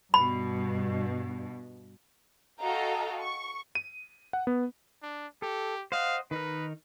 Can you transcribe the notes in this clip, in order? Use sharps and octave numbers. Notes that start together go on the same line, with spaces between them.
G2 B2 B5
F#4 A4 D#5 F5 G5 A#5
C#6
D#7
F#5
B3
D4
G4 A4
C5 D#5 F5 F#5
D#3 D#4 A#4 B4